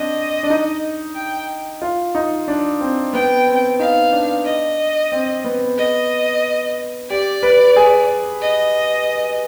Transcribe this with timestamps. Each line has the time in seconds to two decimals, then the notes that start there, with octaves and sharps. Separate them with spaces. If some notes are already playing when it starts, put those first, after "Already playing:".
Already playing: C4 D4 D#5
0.43 D4
0.50 D#4
1.15 G5
1.82 F4
2.15 D#4
2.48 D4
2.81 C4
3.13 B3 G5
3.47 C4
3.79 D#4 F5
4.12 D4
4.46 D#5
5.12 C4
5.44 B3
5.78 D#5
7.10 G4 D5
7.43 B4
7.76 G#4
8.42 D#5